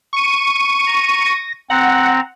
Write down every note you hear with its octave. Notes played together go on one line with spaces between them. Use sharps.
C#6 D#7
A#5
A#6
C4 F#5 A#5